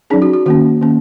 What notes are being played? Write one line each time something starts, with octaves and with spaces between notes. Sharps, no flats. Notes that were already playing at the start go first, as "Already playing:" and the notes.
F#3 C#4 D#4 G#4
F#4
F#4
D#3 A#3 C#4 F#4
D#3 A#3 C#4